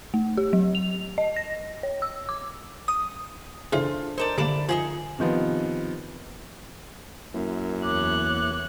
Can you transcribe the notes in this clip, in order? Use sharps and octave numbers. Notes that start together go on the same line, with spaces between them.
A3
G4
F#3
F7
D#5
A#6
C#5
E6
D6
D#6
C#3 E3 D4 F4 A4 C5
D#4 A4 A#4 C5 D5
D3 G3 A#3 E4 D5 A5
F3 D#4 G4 G#4
C3 D#3 F3 B3
F#2 A#3 E4
E2 C#5 D6 F#6